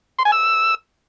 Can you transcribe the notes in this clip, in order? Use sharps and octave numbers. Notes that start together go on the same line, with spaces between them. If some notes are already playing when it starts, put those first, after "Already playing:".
C6
G#5
E6